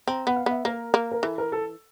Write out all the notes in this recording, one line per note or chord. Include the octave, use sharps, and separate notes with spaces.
C4 A#5
B3 F#5
F5
B3 E5
A#3 A#4
A#3
A#4
E3 A4
A#4
A4